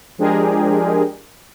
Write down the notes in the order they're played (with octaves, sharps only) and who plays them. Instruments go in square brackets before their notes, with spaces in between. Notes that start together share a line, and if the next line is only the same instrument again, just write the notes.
[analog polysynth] F3 G#3 D4 G4 G#4 A#4